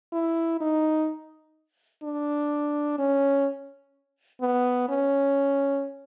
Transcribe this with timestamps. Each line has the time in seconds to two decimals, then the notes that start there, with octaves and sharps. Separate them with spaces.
0.13 E4
0.61 D#4
2.03 D4
2.98 C#4
4.41 B3
4.89 C#4